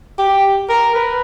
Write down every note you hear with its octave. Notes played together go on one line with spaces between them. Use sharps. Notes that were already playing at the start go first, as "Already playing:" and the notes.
G4
A#4
B4